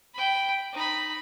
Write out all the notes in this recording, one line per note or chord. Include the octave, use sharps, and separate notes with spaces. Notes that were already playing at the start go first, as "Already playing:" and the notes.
G5 B5
D#4 B5